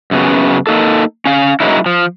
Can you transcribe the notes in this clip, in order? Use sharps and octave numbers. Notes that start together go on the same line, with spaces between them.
F#2 C#3 B3
A#3 D#4 A4
C#4 F5
F#3 G#3 A#3 C#4 D#4 E4
F3